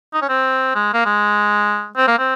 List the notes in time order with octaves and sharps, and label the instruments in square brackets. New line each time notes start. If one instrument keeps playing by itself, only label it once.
[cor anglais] D#4
C#4
C4
G#3
A#3
G#3
C4
A#3
C4